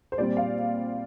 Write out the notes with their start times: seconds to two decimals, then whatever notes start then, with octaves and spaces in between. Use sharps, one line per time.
0.12 C5
0.18 A#2 G3 C4 D5
0.37 F5